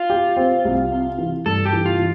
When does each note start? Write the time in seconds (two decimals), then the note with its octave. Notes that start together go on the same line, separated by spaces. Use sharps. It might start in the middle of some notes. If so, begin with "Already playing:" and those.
Already playing: F4
0.10 G4
0.37 C4
0.65 C2
0.91 C3
1.18 E3
1.46 G2 A4
1.65 G4
1.73 E3
1.86 F4
1.99 E3